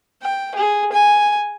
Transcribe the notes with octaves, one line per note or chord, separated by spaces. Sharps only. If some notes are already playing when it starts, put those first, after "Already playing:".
G5
G#4
G#5